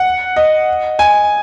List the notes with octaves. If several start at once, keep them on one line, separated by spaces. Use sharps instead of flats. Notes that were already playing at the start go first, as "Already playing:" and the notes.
Already playing: F#5
D#5
G#5